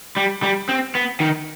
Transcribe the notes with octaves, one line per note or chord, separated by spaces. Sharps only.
G3
G3
C4
B3
D#3